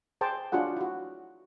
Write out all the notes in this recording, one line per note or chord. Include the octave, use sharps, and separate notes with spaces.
G#4 C5 G5 A5
D4 F4 F#4 G#4 F#5
E4 F#4